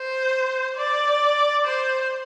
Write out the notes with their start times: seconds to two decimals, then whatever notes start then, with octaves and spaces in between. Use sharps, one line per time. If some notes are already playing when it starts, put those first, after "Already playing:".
Already playing: C5
0.76 D5
1.65 C5